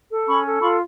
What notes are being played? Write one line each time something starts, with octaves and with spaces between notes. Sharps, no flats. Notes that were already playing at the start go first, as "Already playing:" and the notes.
A4
C#4 B5 C#6
A4
F4 B5 C#6